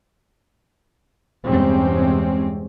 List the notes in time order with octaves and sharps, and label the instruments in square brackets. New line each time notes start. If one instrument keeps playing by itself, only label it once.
[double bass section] E2 G2 C3 G#3 C4 C#4